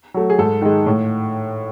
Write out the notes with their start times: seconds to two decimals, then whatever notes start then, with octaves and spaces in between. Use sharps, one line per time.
0.14 F#3 A3
0.30 G#4
0.38 G#2 A4
0.62 D#3 G#3
0.86 A2